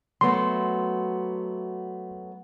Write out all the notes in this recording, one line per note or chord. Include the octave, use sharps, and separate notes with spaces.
F#3 A3 B3 C6